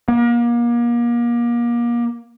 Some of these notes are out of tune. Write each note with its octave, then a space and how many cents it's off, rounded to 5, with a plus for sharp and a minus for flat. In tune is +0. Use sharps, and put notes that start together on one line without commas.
A#3 +30